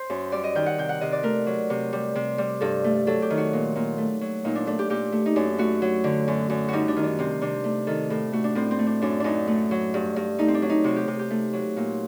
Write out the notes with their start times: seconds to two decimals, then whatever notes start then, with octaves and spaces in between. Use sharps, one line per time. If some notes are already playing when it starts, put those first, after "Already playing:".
Already playing: C5
0.10 F#2
0.32 G3 D5
0.44 D#5
0.55 D#3 G5
0.66 F#5
0.78 C3 G5
0.89 F#5
1.01 C3 D#5
1.12 D5
1.23 A3 A#4
1.47 F#3
1.70 C3
1.93 G3
2.15 C3
2.38 G3
2.61 G2 A4
2.84 A3
3.07 F#3 A4
3.22 G4
3.30 D#3
3.38 F#4
3.53 A#2
3.76 A#2
3.98 A3
4.21 F#3
4.44 A#2 D#4
4.55 D4
4.67 A3 D4
4.79 G4
4.90 A#2 G4
5.12 A3
5.26 D#4
5.36 F#2 D4
5.59 A3 F#4
5.82 F#3
6.04 D3
6.28 F#2
6.50 F#2
6.68 G3 D#4 F#4
6.88 D4
6.96 D#3
7.03 D4
7.19 C3 C4
7.42 C3 D4
7.64 A3
7.87 D#3 A4
8.10 A2 A4
8.32 A3 F#4
8.44 D4
8.55 A2 C4
8.71 C4
8.79 A3
8.86 D4
9.02 F#2 D4
9.20 F#2 D4 D#4
9.48 A3
9.71 F#3
9.94 G2
10.16 G2
10.39 A3 D#4
10.48 C4
10.54 D4
10.62 F#3
10.70 D#4
10.84 C3 F#4
10.96 G4
11.08 C3
11.19 G4
11.30 A3
11.53 F#3
11.77 A#2